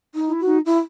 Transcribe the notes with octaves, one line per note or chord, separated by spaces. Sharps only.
D#4
E4
F#4
D#4
E4